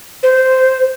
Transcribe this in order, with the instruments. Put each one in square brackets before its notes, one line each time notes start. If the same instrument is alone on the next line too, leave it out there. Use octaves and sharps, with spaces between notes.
[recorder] C5